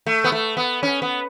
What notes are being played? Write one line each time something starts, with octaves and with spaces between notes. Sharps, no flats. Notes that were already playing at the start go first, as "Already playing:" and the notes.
A3
B3
A3
B3
C#4
B3